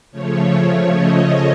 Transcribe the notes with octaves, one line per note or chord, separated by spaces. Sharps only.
C#3 F3 A3 C#5
D#5